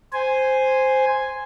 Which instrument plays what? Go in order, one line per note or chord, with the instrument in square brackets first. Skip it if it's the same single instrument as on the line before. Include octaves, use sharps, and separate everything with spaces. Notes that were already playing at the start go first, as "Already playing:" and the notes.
[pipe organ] C5 G#5